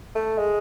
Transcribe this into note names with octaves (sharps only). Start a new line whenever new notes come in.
A3
G#3